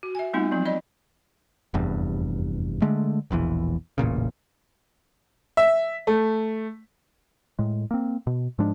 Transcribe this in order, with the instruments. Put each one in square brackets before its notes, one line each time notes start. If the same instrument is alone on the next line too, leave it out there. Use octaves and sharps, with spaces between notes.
[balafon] F#4
E5 G#5
G3 A3 B3 C4 D#4 F4
F3 F#3 C4
D5 D#5 B5
[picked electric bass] F1 E2 G2
D3 G#3 A3
E1 A#1 E2 E3
E1 A1 A#2 C#3
[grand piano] E5
A3
[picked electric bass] A2 G#3
A#3 C4
B2
G#2 F3 G#3 D4